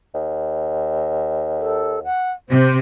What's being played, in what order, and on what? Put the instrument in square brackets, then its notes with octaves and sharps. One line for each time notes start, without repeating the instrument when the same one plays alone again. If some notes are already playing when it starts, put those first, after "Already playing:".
[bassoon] D#2
[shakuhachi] A4
F#5
[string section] C3 [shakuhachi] C5